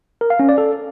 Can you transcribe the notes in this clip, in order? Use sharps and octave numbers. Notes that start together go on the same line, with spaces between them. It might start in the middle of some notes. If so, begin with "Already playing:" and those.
A#4
F5
C#4
D5
A4